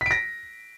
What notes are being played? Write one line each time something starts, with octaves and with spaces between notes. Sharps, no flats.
A#6 B6 D7